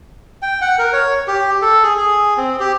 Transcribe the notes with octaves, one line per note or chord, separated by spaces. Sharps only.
G5
F#5
A#4
C#5
G4
A4
G#4
G#4
C4
G4